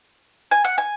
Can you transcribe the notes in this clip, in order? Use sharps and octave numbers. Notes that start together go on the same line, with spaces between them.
G#5
F#5
G#5